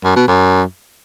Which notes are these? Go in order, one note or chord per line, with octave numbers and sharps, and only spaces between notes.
F#2
B2
F#2